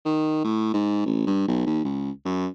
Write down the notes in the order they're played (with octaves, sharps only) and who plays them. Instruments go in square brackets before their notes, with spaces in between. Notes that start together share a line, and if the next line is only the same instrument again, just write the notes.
[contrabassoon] D#3
A2
G#2
A1
G2
B1
D#2
C#2
F#2